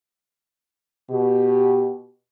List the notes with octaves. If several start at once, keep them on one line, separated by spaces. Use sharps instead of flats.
B2 G4